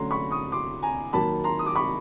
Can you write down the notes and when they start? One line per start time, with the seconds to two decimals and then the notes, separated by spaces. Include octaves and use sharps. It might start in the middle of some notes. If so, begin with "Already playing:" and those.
Already playing: D3 F#3 A3 C#4 A#5 C6
0.11 B5 C#6
0.31 C#6 D#6
0.52 C6 D6
0.83 G#5 A#5
1.13 D#3 F#3 A#3 A5 B5
1.44 A#5 C6
1.59 D#6
1.66 D6
1.76 B5 C#6